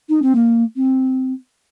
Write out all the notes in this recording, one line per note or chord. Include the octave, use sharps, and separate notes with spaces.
D#4
C4
A#3
C4